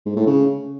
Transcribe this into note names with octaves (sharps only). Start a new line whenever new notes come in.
G#2
A2
C#3